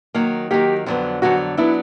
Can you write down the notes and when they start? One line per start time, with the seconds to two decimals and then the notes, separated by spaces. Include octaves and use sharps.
0.14 D#3 F#3 A#3
0.51 D#3 F#3 A#3 G4
0.86 F2 D3 F#3 B3
1.22 F2 D3 F#3 B3 F#4
1.57 F#3 B3 D4 E4